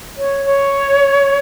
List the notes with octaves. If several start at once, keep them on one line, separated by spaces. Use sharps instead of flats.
C#5
C#5